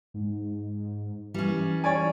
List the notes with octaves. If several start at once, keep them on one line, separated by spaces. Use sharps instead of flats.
G#2
E3 G3 C#4
C#5 D5 G#5